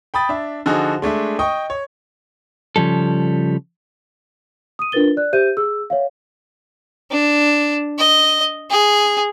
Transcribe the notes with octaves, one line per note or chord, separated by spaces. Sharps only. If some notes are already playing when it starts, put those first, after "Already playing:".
G5 B5 D#6 A6
D4 E5
D3 F3 D#4 F#4 G#4
G#3 A3 D4 E5
D#5 G5 C#6 D#6
C#5
C#3 F3 G3 A4
D#6 D#7
D4 F4 A#4 B4 A6 G7
D5 F#6
G4 C5 E5 G6 D#7
G#4 E6
C#5 E5 F5
D4
D#5
G#4